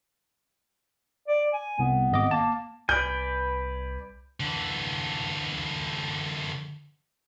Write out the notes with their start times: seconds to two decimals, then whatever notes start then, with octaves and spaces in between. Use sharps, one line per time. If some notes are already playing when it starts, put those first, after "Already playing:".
1.28 D5
1.53 G#5
1.79 C2 B3
2.12 G#1 D#5 D6
2.31 A#3 A5
2.89 C2 B4 D5 G#5 G6
4.40 D3 E3